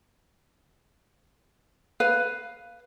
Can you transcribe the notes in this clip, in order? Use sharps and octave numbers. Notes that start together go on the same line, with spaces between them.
B4 F5